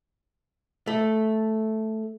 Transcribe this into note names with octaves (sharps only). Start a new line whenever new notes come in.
A3